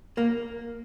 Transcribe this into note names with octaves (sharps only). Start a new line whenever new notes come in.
A#3